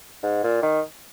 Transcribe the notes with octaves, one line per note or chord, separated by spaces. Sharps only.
G#2
A#2
D#3